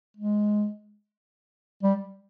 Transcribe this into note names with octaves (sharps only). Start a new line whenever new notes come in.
G#3
G3